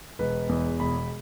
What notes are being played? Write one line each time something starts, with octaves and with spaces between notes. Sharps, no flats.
E1 B4
E2
E1 B5